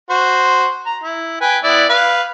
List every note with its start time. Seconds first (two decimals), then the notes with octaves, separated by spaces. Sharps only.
0.10 F#4 C5
0.85 A#5
1.04 E4
1.41 B4 G5 G#5
1.64 B3 E4 D5
1.89 B4 F5